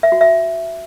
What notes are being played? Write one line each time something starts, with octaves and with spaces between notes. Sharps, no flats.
E5
F#4
E5